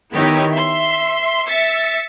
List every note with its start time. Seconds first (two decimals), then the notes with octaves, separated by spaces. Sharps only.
0.13 D#3 B3 D#4 E4 G4 C#5
0.53 E5 C6
1.47 E5 E6 A6 C#7